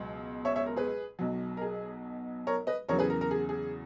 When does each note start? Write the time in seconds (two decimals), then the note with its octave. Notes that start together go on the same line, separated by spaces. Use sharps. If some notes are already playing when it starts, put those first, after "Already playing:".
Already playing: C#2 B2 F#3
0.45 C#5 E5
0.56 C#5 E5
0.66 A#4
0.77 G#4 B4
1.19 B1 B2 F#3
1.57 A#4
1.61 G#4
2.47 A#4 C#5
2.67 B4 D#5
2.88 E2 C#3 F#3 A#4 C#5
2.99 G#4 B4
3.10 A#4
3.21 A#4
3.31 G#4
3.49 G#4